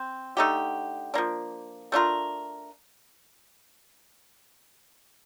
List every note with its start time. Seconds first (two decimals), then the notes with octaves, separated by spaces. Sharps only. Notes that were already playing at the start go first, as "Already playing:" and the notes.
Already playing: C4
0.37 D3 A3 D#4 G4
1.14 F3 A#3 D4
1.92 A3 D4 F4 A#4